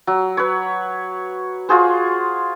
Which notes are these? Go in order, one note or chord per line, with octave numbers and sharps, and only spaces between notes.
F#3
B4 C#5
F4 F#4 G#4 C5